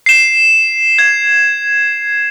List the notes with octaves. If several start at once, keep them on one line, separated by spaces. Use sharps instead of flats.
C7 E7
G#6